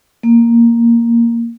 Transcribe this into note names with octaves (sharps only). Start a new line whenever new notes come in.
A#3